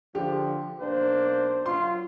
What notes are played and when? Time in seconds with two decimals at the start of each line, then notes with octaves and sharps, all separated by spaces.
0.15 D3 F3 G4
0.80 B1 A#3 D4 C5
1.66 F#3 F4 C6